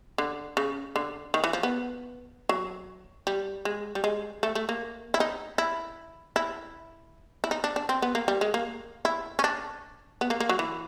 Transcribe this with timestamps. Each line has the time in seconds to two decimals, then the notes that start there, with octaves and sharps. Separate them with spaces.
0.18 D3
0.57 C#3
0.96 D3
1.34 D#3
1.44 E3
1.53 F3
1.63 B3
2.49 F#3
3.27 G3
3.65 G#3
3.95 G3
4.04 G#3
4.43 A3
4.55 A3
4.69 A#3
5.14 E4
5.20 D#4
5.58 E4
6.36 E4
7.44 E4
7.51 D#4
7.64 D4
7.76 D4
7.89 C4
8.02 B3
8.15 A#3
8.28 G3
8.41 G#3
8.54 A#3
9.05 E4
9.39 C#4
9.44 D4
10.21 B3
10.30 A#3
10.40 A#3
10.49 F#3
10.59 E3